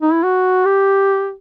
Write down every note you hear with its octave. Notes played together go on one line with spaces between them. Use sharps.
D#4
E4
F#4
G4